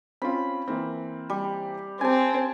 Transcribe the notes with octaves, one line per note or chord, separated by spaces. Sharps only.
C4 C#4 F4 B5
E3 A#3 C4
G3
C4 G4 G#5 A5